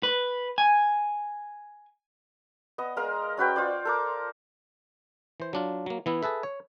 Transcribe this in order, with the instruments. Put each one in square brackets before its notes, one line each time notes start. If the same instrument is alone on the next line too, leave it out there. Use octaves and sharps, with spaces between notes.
[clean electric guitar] B4
G#5
[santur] B3 D#5
G#3 A#4 F5
C#4 F#4 B4 G5
F4 C5 D5
A4 A#4 D6
[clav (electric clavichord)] E3 C5
F#3 D4 F4
F#3 A#3
E3 B3 E4
G#4 A4 B4 E5
C#5